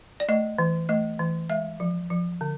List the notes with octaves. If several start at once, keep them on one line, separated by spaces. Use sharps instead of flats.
D5
A3 D#5
E3
A3 D#5
E3
G#3 E5
F3
F3
D3